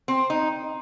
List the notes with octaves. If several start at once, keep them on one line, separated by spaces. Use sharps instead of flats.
C4
D#4